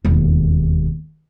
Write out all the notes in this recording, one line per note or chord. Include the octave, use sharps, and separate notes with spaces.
E1 D#2